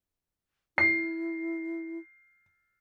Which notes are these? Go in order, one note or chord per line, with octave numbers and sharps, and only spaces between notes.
E4 C7